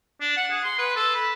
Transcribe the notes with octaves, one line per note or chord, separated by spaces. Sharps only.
D4
F#5
G#4
C6
B4
A4
B5